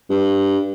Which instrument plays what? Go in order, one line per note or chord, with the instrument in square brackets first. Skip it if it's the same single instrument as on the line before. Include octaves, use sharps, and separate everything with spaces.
[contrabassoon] G2